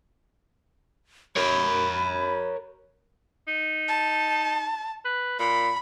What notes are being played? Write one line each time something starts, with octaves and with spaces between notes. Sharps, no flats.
A#4 C#5 B5
D#4
A5
B4
A#2 B5